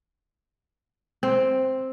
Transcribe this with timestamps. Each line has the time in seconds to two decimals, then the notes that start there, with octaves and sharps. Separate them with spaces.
1.23 C4